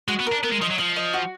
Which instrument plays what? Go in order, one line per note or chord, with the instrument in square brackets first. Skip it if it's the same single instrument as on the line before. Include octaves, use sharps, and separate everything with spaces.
[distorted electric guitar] G#3 [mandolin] F#4
[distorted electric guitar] B3
[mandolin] A#4
[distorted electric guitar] D4
[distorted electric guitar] B3 [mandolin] A#4
[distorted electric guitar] G#3
[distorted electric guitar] F3 [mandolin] D#5
[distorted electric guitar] F#3
[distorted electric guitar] F3 [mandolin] D#5
[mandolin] D#5
F#4